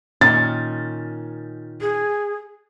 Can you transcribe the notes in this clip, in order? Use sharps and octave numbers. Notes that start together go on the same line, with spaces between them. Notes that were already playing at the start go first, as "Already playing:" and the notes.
A#2 D#3 C#4 A6
G#4